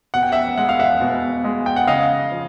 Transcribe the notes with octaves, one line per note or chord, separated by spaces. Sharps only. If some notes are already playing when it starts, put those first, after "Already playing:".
B2 F#5
G5
E5 F#5
G#3 F#5
F5
E5 F#5
B2
G#3
G5
F#5
C#3 D#5 F5
F3